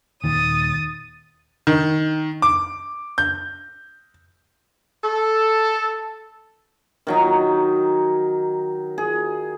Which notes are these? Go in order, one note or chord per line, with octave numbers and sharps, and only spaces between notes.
D#1 D#2 D#3 D#6 A6
D#3
D6
G6
A4
D#3 F#3 D#4
G#4